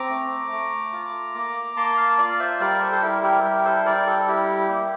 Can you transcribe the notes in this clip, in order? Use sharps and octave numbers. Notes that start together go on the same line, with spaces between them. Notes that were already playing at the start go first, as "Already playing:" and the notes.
Already playing: C4 A#5 D6
A3
A3
F4
A#3
A#3 A5 C6
A#5
F5 A5
F4 D5 F5
C5 E5
G3 A#4 D5
A4 C5
A4
E4 G4 A#4
G4 A#4
G3 G4 A#4
A4 C5
G3 A#4 D5
A4
E4 G4
A#3